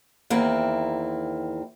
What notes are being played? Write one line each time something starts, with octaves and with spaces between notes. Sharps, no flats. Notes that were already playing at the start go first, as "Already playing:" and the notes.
E2 D#3 A#3 C4 E4